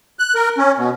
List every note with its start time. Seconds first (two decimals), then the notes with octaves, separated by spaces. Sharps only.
0.19 F#6
0.35 A#4
0.58 C#4
0.77 B2